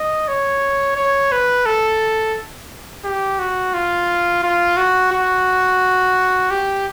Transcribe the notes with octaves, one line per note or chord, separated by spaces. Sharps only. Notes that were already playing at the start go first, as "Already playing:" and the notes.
Already playing: D#5
C#5
C#5
B4
A4
G4
F#4
F4
F4
F#4
F#4
G4